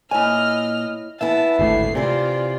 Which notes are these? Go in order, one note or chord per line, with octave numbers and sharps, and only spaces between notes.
A#2 E4 C#5 D#5 G#5 F6
E3 B3 E4 E5 A5
G#1 D2 A2 A3 C7
C3 E3 F4 C5 D5